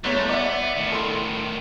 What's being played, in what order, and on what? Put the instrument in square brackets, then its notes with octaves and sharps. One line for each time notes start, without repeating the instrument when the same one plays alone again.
[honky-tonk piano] G1 E2 C#5 [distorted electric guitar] A3
[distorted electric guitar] B3 [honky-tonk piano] D5 E5
[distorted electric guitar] A2 D#3
[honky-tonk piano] A4 B5 C6
C#7 D7